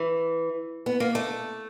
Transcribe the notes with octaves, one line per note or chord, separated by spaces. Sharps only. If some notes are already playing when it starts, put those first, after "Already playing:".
Already playing: E3
B3
A#3
A3